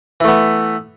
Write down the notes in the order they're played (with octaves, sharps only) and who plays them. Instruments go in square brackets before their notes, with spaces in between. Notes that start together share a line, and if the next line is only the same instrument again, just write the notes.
[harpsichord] E3
A3
B3